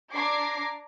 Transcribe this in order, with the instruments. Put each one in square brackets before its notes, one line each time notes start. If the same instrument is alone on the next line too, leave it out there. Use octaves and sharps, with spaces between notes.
[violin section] D4 A#5 D6 G#6 A#6 C7